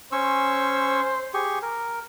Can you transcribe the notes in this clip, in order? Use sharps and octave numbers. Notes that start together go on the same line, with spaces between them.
C#4 C5 C#6 E6
G4 G#4 C#6
A#4